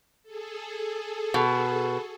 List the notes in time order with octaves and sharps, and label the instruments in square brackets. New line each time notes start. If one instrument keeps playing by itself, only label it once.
[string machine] G#4 A4
[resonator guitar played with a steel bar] B2